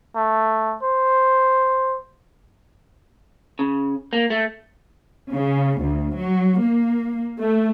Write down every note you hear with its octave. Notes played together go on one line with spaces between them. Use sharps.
A3
C5
C#3
A#3
A3
C#3
D2
F#3
A#3
A3